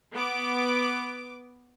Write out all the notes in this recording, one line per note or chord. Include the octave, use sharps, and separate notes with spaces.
B3 D6